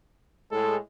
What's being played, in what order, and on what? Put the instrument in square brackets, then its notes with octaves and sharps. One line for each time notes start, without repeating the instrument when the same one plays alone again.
[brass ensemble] A2 G#3 [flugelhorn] A4